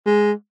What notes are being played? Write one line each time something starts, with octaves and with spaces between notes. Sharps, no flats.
G#3